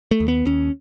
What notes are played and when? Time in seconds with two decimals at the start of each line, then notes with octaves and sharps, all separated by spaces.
0.11 A3
0.20 D#2
0.28 B3
0.46 D#2 C#4